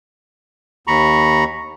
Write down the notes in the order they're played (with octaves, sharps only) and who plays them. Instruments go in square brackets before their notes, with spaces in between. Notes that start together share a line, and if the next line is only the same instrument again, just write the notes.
[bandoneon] D#2 A#5 B5 C#6